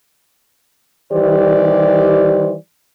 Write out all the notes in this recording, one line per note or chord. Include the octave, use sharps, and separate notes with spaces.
D#3 E3 G3 G4 C5 D5